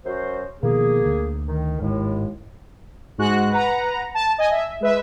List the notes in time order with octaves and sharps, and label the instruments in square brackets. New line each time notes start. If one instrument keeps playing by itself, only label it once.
[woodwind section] F#2 F#4 C5
[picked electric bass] B2 D#3 F3 [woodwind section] A#3 G#4
[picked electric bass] D2
[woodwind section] D#3
[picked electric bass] G#1 [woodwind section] D#2 A2 G#3
[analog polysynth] G#2 G#3 F#4 F#6
B4 F#5 A#5
A5
D#5 G#5
E5
G#3 B4 E5